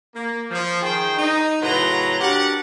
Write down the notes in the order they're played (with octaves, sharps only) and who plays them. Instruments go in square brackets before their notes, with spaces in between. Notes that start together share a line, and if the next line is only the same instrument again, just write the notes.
[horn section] A#3
F3
D#3 G#4 C5 G5
D#4
A2 C#3 F#3 B4 A#5 C6
D4 F#4 G4 A#4 F#5